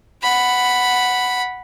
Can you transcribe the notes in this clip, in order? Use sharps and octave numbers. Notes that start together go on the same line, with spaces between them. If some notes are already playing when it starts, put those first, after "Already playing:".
F#5 B5